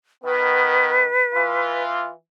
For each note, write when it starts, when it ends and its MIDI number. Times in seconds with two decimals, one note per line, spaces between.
0.24 1.08 51
0.24 1.08 59
0.24 1.83 71
1.35 2.12 52
1.35 2.12 65